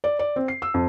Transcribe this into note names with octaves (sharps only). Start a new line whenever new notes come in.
D5
D5
C4
C7
E6
F2